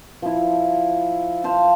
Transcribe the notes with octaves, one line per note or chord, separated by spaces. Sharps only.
F3 E4
C5 F5 A5